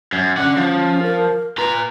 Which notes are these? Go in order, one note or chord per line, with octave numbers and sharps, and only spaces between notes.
F#2
C#4 D4 F#5
F3
A#4
F4 B4 A#5